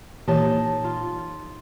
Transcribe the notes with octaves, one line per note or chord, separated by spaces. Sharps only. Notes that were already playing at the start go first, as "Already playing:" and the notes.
A#2 E3 D#4 G4 C#5 A5
F4